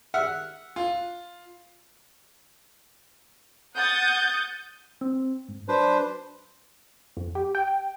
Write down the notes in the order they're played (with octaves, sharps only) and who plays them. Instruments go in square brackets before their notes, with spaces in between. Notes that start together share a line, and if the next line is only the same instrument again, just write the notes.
[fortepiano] E5 F#5 F6
[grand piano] F4
[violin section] F#5 D#6 G6 A6
[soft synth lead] C4
G#2
[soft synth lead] F#3 [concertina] D4 B4 C5
[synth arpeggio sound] F2
G4
G5